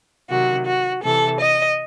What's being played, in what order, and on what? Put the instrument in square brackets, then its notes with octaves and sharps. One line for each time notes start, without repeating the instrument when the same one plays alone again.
[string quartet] C3 D#3 F#3 F#4
F#4
C3 E3 A4
D#5